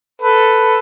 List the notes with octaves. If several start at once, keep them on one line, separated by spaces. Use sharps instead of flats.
A4 B4